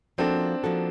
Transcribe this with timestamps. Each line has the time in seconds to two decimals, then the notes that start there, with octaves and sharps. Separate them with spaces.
0.18 F3 A#3 C4 D4 D#4 F#4 A4
0.64 F3 A#3 D#4 F#4 A4